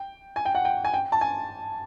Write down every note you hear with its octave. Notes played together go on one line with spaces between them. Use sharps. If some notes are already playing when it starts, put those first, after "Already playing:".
Already playing: G5
G#5
G5
F#5
G5
G#5
G5
A5
G#5